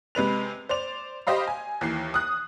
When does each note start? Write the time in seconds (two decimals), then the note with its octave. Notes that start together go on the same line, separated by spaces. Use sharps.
0.15 C3 G#3 B4 F7
0.69 C5 D5 F7
1.27 G4 C5 D#5 F5 B5
1.47 G#5
1.81 D#2 E3 C7
2.14 D#6 F#6